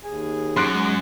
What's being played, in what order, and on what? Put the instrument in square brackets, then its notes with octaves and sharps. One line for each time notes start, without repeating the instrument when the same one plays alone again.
[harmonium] D#2 G#4 G#5
[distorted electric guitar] F#2 [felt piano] C6 F#6 D7
[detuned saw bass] G#3